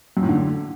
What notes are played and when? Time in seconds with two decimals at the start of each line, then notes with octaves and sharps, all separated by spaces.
0.17 F#2
0.23 A2
0.29 D3